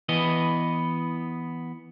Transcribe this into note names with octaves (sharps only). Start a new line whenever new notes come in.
E3 B3 D#5